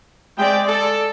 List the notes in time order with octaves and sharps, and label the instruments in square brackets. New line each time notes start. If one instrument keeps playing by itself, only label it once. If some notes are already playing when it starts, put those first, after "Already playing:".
[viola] G#3 D5 [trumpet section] C4 E5 G5
[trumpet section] A4